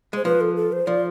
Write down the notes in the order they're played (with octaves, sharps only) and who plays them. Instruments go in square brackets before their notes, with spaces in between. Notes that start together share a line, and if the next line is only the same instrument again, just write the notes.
[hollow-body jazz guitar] G#3 [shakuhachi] C5
[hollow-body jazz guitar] F3 [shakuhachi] B4
[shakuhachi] A4
A4
C5
[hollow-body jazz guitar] F3 [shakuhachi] D5